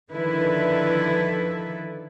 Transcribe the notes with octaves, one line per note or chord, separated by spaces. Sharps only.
D3 D#3 F3 E4 A4 B4